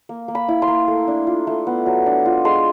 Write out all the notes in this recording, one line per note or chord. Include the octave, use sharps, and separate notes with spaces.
A#3
A#3
B5
E4
C6
A#3
A3
D4
F4
A3
B3
F#3
D4
F4
G#3 C6